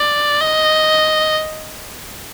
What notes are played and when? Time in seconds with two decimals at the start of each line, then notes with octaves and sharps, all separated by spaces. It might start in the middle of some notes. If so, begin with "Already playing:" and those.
Already playing: D5
0.41 D#5